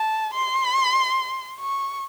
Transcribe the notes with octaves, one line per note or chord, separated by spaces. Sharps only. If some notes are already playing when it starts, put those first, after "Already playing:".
Already playing: A5
C6
C#6